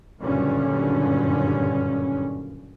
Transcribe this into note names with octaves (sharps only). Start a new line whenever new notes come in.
F#1 G2 A#2 D3 C#4